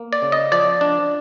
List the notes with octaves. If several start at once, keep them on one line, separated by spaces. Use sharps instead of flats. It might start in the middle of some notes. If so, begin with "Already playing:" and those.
Already playing: A#3
D5
C#3
D#5
F3 D5
D4